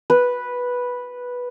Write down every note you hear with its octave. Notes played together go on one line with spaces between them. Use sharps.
B4